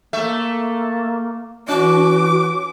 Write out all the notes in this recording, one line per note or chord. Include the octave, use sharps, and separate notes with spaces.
A3 A#3 E5
E3 C#4 F#4 D6